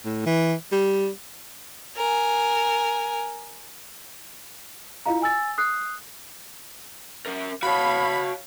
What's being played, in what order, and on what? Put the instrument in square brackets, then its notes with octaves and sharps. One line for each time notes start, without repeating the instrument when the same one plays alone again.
[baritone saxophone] A2
E3
G3
[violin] A#4 G#5
[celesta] E4 F4 D#5 F5 A#5
G#5 E6 A6
D#6 F#6 C7
[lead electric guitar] C#4 A#4
[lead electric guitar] F#4 A5 [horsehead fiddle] C#5 F5 [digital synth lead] B5